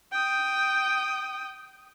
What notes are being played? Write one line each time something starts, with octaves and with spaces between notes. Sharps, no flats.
G5 D#6